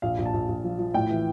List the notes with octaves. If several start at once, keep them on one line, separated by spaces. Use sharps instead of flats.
A#1 F5
A#1
A5
A#1
A#1
F3
F3
A2 G5
E3